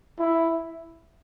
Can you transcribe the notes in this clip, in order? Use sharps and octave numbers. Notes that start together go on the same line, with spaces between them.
E4